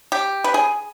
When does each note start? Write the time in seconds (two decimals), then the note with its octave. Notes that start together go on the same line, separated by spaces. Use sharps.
0.12 G4
0.44 B4
0.54 G#4